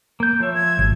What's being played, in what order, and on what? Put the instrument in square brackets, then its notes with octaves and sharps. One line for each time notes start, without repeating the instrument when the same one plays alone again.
[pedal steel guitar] A#3 G6
[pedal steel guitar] F3 E5 [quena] C#5
[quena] G#6
[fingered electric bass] G#1